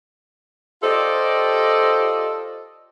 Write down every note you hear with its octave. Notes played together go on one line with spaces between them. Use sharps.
F4 G4 A4 C5 D5 D#5